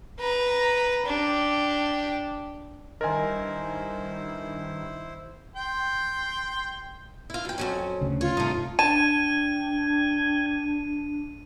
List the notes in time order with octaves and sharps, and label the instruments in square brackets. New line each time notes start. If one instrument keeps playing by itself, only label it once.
[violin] B4 A#5
D4 G4
[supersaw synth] G2 D#3 [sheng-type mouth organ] E4 C5 [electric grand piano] A#4 G#5 [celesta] D#5 C6
[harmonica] G5 C6
[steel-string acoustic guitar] E4 F4
F#2 G5
F2 F#3 C#4
[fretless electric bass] D2 C#3
[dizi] F4 [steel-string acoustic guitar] C#5
[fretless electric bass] G2 C3 [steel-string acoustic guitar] A3 D#4
[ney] D4 [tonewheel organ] G5 G#6 [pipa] A5 [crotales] D#7